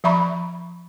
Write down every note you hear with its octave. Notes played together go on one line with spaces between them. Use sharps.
F3 E5 A#5 B5 C#6